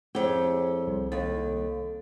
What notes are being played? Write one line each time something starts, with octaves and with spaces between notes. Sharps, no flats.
F2 E4 G4 G#4 C#5
C2
D#2 A4